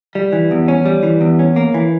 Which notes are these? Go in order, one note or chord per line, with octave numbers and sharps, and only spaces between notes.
G3
E3
E2
C#4
G3
E3
E2
C#4
A#3
E3